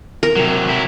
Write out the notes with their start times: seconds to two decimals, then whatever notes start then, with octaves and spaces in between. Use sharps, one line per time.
0.23 A#4
0.36 C3 F#3
0.69 F#3 E4